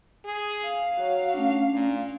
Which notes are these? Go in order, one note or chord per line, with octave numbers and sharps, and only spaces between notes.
G#4
F5
F#3 F#4 C#5
A3 C#4 D4
A#2